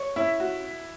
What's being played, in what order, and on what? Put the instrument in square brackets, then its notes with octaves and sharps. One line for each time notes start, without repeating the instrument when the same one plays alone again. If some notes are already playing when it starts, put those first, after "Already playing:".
Already playing: [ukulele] C#5
[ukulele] C#4 [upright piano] E4 E5
[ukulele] F#4